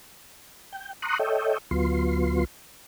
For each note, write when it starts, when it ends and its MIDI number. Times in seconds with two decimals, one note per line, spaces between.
0.73 0.93 79
1.02 1.18 82
1.02 1.18 84
1.02 1.18 85
1.02 1.18 87
1.02 1.18 90
1.19 1.58 69
1.19 1.58 73
1.19 1.58 75
1.19 1.58 76
1.19 1.58 79
1.71 2.45 38
1.71 2.45 54
1.71 2.45 59
1.71 2.45 65
1.71 2.45 84